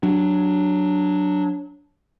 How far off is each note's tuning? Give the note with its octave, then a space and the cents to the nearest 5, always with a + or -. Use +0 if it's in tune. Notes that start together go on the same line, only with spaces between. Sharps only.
F#3 +0 D4 +0